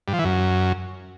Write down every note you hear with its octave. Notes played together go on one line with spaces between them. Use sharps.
G2
F3
E3
F#2